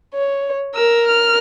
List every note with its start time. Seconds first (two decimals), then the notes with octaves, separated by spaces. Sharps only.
0.14 C#5
0.75 A#4 E6
1.07 F6